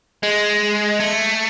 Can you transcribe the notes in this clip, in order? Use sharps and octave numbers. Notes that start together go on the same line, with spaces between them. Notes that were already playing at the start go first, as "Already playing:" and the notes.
G#3
A3